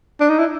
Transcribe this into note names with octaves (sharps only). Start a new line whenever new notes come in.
D4
D#4
E4